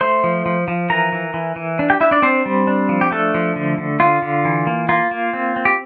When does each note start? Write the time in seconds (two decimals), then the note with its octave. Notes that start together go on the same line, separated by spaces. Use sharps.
0.01 A3 C5 C6
0.24 F3
0.46 F3
0.68 F3
0.90 E3 A#4 A#5
1.12 E3
1.34 E3
1.56 E3
1.79 D4
1.90 G4 G5
2.01 D4 E4 E5
2.11 D4 D5
2.22 C4 D4 C5
2.46 G3
2.67 D4
2.89 F3
3.01 G4
3.11 A3 D4 A4
3.34 F3
3.56 D3
3.78 D3
4.00 D3 F4
4.22 D3
4.45 E3
4.67 A#3
4.89 A#3 F4
5.11 A#3
5.33 C4
5.56 C4
5.65 G4